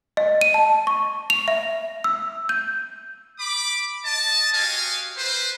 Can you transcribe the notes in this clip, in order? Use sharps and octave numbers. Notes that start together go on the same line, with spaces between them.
D#5
D#7
A5
C#6
F7
E5
E6
G6
B5 D6
D#5 A5
F#4 G4 D#5 F5 G#5
B4 C5